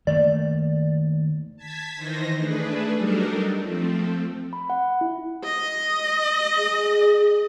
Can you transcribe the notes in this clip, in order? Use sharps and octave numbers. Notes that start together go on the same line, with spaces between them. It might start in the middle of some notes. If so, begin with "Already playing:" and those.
D#3 A3 A#3 D5
A5 G#6 B6
D#3 E3 D#4 C5 A#6
A3 D4 G#4 B4
F#3 G3 D4 D#4 A4 A#4
F3 A3 C4
B5
F#5
E4
D#5
G#4